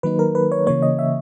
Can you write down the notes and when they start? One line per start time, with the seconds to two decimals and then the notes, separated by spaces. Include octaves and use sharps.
0.03 D#3 F#3 A#3 D#4 B4
0.19 A#4
0.35 B4
0.52 C#5
0.66 C#3 E3 A#3 C#5
0.82 D#5
0.99 E5